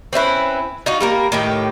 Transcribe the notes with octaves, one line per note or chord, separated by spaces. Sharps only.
C4 C#4 E4 B4
D#4 F4 F#4
G3 A#3 A#4
A2 D#3 G4